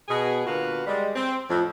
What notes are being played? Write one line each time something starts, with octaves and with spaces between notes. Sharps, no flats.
B2 G#4
A#2 D3 B3 F#4 B4 F5
G3 G#3
C4
F2 A2